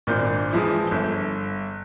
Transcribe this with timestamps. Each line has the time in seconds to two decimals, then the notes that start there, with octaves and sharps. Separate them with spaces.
0.07 G#1 A#2 A#3 D4 G6
0.53 E3 F3 G#3 E4
0.91 G1